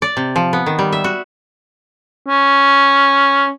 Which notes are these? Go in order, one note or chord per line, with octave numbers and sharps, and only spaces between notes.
D5
C3
F3
B3
D#3
G3
E5
F#4
C#4